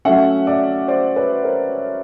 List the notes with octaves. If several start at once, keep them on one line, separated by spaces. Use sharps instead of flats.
F#3 A3 C#4 E5 F#5
D5 E5
C5 D5
B4 C#5
A#4 C5